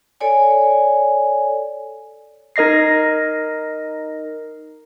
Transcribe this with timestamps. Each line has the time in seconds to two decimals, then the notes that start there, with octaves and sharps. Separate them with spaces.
0.20 A4 C#5 D5 G#5
2.56 D#4 A#4 D#5 A#6 C7